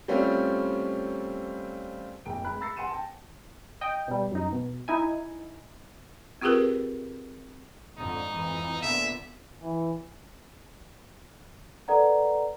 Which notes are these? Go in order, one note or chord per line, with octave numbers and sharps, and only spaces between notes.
G3 A3 C4 C#4 F4
F1 A#1 G5 D7
D1 G#3 B5 F#6
B5 E6 A6 A#6 C7 C#7
F#5 G#5 C6 C#7 D#7 E7
G5 A5
D#5 G5
B2 G3
F#2 D#4
B2
D#4 E4 G#5
C4 F4 G4 G#4 A#4 B4
F2 G#2 D3 D#4
F2 E3
A#2 D3 B3 E5
E3
A4 B4 D5 F#5 A#5